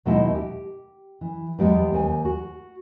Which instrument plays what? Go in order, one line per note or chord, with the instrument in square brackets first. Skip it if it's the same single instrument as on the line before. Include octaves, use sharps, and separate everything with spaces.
[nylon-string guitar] D#2 B2 G#3 D#4 E4
G4
E3
E2 G3 G#3 B3
D#2 C5 G#5
F#4